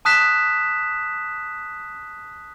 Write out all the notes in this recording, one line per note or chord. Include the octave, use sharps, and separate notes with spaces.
A5 D#6 F#6 B6 E7